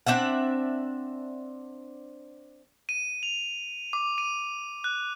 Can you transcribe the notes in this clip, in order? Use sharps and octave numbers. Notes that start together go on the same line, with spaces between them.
C4 D4 E5 F#5
D#7
F7
D6
D#7
F#6